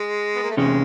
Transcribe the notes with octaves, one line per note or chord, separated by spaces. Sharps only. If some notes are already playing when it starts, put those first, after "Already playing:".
Already playing: G#3
B3
A#3
A3
E2 C3 G#3 C#4